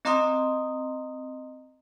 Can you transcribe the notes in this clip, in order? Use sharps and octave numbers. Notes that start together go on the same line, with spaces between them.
C4 D#5 A#5 C6 D#6